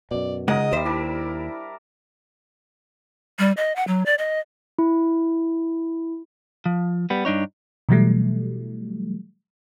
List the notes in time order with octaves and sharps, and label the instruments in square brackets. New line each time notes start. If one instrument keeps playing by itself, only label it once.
[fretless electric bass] F#2 B2 [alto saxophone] D5
[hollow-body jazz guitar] C#2 G#3 F#5 [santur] D#4 A#4 [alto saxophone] D#5
[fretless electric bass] D#2 [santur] G3 E5 [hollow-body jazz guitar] C5
[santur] D4 A#4 [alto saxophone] E4
[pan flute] G3
D#5
F#5
F#3
D5
D#5
[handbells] E4
[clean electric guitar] F3
G3 B3
G2 D4 D#4 C#5
[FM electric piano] B2 E3 F#3 G3 A3